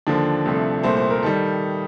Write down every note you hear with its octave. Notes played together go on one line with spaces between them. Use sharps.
D#2 D3 F3 D4
C2 C3 F3 A3
C2 A#2 A3 C5
C5
A#4
D#3 G3 A4